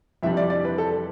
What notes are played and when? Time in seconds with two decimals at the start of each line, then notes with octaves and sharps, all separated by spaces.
0.23 F2 C3 E3 G3 D4 E5
0.37 D5
0.50 D5
0.65 B4
0.78 A4